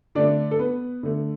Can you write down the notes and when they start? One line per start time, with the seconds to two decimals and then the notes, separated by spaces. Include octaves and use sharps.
0.15 D3 A3 D4 D5
0.51 A4
0.59 B3 B4
1.03 D3 A3